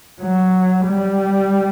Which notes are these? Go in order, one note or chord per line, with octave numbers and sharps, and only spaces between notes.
F#3
G3